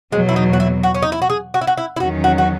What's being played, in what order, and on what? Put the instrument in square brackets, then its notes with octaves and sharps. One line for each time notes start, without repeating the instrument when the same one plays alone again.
[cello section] E2 B2 F#3 [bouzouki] G#3
[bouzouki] E4
D#4
F#4
E4
F#4
C#4
D#4
E4
F#4
G#4
F#4
E4
F#4
E4
E4
[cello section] E2 D#3 F#3 C#4 [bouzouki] F#4
[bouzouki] F#4
F#4